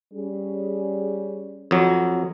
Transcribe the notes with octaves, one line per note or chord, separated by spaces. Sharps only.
G3 C#4 G#4
F2 F#3